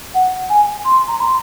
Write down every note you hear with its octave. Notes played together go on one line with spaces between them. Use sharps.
F#5
G#5
C6
A#5
C6